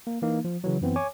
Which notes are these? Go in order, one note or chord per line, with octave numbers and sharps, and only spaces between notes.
A#3
E3 A#3 D#4
F3
C#3 E3 F#3
F#2 E3 B3 C4
C#5 G#5 D6